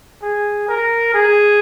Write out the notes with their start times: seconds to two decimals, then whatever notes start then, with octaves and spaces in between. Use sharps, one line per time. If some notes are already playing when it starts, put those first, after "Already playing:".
0.22 G#4
0.68 A#4
1.14 G#4